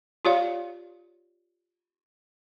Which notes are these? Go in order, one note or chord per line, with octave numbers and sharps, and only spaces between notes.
F4 G4 C#5 D5 F5